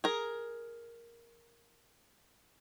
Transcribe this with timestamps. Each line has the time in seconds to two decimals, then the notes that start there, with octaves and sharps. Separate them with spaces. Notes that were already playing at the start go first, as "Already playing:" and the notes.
0.04 G#4 A#4